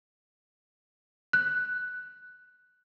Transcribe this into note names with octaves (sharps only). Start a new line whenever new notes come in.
F#6